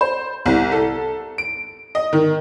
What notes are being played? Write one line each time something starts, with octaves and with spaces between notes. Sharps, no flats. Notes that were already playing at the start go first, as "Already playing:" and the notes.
C5
C2
A4
D7
D#5
D#3